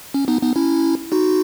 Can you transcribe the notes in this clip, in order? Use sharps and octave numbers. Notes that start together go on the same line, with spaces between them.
C#4
B3 D#4
B3 D#4
C#4 E4
D#4 F#4